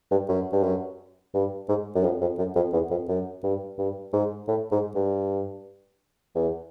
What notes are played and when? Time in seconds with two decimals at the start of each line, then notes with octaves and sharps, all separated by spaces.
0.11 G2
0.29 F#2
0.52 G2
0.63 F#2
1.34 G2
1.69 G#2
1.95 F#2
2.03 F2
2.21 F2
2.38 F#2
2.56 F2
2.73 E2
2.91 F2
3.09 F#2
3.43 G2
3.78 G2
4.13 G#2
4.48 A2
4.71 G#2
4.95 G2
6.35 E2